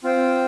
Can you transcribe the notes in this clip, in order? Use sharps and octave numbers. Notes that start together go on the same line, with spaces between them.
C4 F4 C5 G5